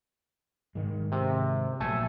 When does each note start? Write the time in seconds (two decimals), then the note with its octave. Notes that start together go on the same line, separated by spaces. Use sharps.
0.75 G#2 D#3 G#3
1.12 C3
1.80 A#1 D3 F#3 A3 A4 G#5